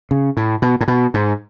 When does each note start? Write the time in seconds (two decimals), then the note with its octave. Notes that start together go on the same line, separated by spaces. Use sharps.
0.11 C#3
0.37 A2
0.62 B2
0.81 A2
0.88 B2
1.14 G#2